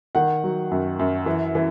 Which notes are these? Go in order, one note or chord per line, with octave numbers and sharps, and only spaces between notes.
D#3 F#5
F#3
F#2
F#2
E3
E3